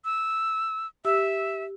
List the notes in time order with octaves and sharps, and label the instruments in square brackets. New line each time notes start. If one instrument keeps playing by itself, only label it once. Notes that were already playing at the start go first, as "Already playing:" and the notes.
[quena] E6
[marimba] G4 E6 [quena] E5